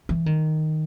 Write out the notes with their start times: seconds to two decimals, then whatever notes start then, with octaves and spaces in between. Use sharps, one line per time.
0.09 E3
0.26 D#3